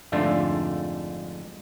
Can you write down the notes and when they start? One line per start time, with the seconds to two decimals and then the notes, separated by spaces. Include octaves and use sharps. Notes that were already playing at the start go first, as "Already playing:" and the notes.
0.12 F2 G#2 D3 A3 D4 F4